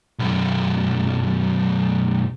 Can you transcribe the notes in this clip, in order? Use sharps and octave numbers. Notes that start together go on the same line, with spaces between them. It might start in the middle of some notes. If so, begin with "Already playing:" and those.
B1 F#2